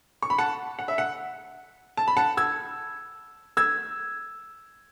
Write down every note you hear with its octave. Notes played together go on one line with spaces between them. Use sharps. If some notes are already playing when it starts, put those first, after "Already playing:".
C#6
B5
F#5 A5
F#5
E5
F#5
A5
B5
F#5 A5
E6 G#6
E6 G#6